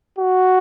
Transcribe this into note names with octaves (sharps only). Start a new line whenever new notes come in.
F#4